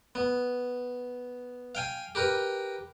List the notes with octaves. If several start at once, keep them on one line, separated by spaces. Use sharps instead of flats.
B3
F5 G5 G#5
G4 A#4 B4